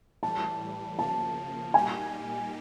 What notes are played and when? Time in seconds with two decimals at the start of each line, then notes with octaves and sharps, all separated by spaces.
0.23 A2 E3 G3 A5
0.99 C#3 F3 A#3 A5
1.74 A#2 G3 A#3 D#4 G4 G#5